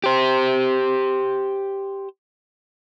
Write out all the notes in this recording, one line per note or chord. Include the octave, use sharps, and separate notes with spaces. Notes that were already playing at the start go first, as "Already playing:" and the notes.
G4 C5